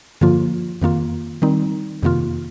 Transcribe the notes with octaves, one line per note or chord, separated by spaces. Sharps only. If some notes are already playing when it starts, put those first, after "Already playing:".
G2 D3 F3 A#3 F4
F2 D#3 A#3 F4
D#3 G3 C4 D#4
F2 C3 D#3 A#3 F4